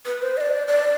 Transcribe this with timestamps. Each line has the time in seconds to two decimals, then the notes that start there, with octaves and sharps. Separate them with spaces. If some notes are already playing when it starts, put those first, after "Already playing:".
0.06 B4
0.22 C5
0.37 D#5
0.41 D5
0.68 D5